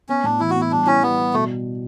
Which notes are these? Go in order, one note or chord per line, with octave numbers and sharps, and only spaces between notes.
B3 C#4
A2 D4
E3 E4
F#4
B3
E4
G3 D4
C#4 E4
G3 B3
G3
B2 A3